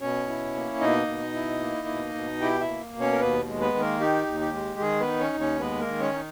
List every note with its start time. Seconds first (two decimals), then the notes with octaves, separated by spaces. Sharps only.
0.01 B2 C#4 C#5
0.28 E4
0.55 A#3
0.81 B2 D#4 D#5
1.07 B2
1.34 E4
1.61 A#3
1.88 B2
2.14 B2
2.41 E4 G4 G5
2.60 E4 E5
2.68 A#3
2.94 B2
3.01 C#4 C#5
3.12 A#4
3.20 D#2 B3 B4
3.47 G#3
3.60 B3 B4
3.74 D#3
3.81 A#3 A#4
4.00 D#4 G4
4.27 D#2
4.40 G4
4.54 G#3
4.80 D#3 G#4
5.00 B3 B4
5.07 D#4
5.20 C#4 C#5
5.34 D#2
5.40 C#4 C#5
5.60 G#3 B3 B4
5.80 A#3 A#4
5.87 D#3
6.00 C#4 C#5
6.14 D#4